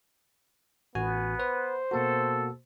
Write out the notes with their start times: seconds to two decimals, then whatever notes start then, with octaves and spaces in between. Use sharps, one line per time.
0.95 A1 B3 F#4 G#5
1.40 B4 C5
1.91 B2 A#3 F#4 A4